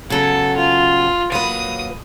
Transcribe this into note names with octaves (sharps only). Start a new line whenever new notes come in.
C#3 F#3 B3 A4
F4
F#3 A#3 B4 D#6